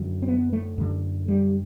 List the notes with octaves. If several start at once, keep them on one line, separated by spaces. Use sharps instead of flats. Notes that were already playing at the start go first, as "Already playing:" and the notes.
Already playing: F#2 D3 F#3
C4
B3
A3
F#2 D3
G3